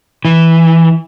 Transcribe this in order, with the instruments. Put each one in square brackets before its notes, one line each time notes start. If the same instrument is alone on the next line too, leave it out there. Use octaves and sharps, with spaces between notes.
[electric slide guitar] E3